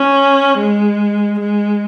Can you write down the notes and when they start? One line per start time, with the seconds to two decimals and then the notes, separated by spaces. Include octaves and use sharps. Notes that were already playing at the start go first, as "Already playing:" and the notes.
Already playing: C#4
0.58 G#3
1.39 G#3